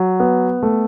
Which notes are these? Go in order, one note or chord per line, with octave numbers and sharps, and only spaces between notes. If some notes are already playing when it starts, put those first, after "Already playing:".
Already playing: F#3
B3
A3